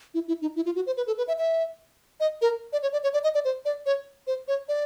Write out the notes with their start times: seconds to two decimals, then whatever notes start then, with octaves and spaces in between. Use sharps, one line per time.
0.14 E4
0.28 E4
0.42 D#4
0.56 E4
0.66 F4
0.76 F#4
0.87 C5
0.97 B4
1.07 A4
1.18 B4
1.28 E5
1.38 E5
2.20 D#5
2.42 A#4
2.73 D5
2.83 C#5
2.93 D5
3.03 C#5
3.13 D5
3.24 D#5
3.34 D5
3.45 C5
3.65 D5
3.86 C#5
4.27 C5
4.48 C#5
4.68 D5